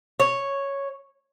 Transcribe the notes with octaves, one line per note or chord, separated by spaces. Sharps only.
C#5